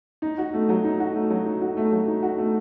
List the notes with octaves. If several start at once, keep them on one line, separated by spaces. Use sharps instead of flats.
D#4
F#4
A3
F#3
D#4
F#4
A3
F#3
D#4
F#4
A3
F#3
D#4
F#4
A3